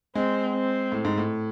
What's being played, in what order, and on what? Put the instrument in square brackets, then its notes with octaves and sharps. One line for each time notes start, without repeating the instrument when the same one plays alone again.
[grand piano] G#3 [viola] C4
[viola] C4
[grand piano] A2
G#2
A2